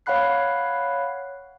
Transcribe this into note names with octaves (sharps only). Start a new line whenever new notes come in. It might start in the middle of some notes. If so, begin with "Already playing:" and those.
C#5 F5 F#5 B5 F#6 C7